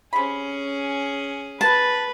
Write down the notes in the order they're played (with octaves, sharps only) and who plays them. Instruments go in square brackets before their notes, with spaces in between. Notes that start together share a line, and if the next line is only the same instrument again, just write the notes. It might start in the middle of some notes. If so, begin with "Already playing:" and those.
[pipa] C3 B5 [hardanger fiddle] C#4 G#4
[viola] B4 [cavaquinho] A5